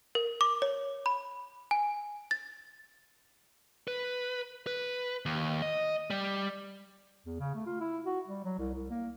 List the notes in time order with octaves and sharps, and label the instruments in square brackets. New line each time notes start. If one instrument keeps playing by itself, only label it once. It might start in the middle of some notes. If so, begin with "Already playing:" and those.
[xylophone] A#4
D6
C#5
B5
G#5
A6
[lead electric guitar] B4
B4
D#2
D#5
G3
[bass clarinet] E2
C#3
A3
F4
E4
F#4
G3
F#3
C2
C2
A#3